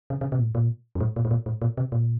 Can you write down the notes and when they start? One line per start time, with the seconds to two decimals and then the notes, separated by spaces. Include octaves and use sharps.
0.10 C#3
0.21 C#3
0.32 C3
0.38 A#2
0.44 A2
0.55 A#2
0.95 F#2
1.00 A2
1.16 A#2
1.25 A2
1.31 A#2
1.46 A2
1.62 A#2
1.77 C3
1.92 A#2